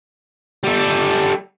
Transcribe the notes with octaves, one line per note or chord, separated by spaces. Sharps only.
G3 A4